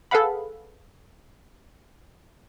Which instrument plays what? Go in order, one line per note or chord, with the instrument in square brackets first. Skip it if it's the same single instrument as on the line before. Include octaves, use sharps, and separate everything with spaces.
[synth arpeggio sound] G#4 A4 B4 F5 F#5 B5